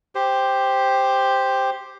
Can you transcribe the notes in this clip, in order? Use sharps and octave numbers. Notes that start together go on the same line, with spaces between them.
G4 C5